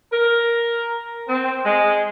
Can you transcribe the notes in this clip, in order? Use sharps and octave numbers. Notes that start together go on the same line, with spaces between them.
A#4
C4
G#3